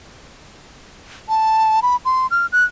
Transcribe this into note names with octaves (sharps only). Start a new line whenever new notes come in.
A5
B5
C6
F6
F#6